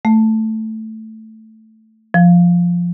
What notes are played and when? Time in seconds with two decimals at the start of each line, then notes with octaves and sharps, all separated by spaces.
0.05 A3
2.14 F3